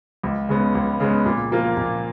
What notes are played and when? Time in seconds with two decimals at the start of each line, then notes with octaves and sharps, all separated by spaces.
0.23 C#2
0.49 C#3 G#3 B3
0.75 C#2
1.00 C#3 G#3 B3
1.26 A#2
1.51 F3 A#3 F4 A#4
1.77 A#2